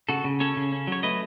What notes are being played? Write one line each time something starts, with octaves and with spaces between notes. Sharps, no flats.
C#3 F#4 A4
C#3
C#4 A4 C#5
C#3
C#4
F#3 C#5
A3 B4 D#5